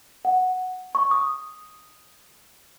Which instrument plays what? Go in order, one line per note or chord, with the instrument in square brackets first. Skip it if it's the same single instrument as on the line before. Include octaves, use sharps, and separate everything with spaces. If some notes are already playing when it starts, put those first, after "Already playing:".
[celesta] F#5
C#6
D#6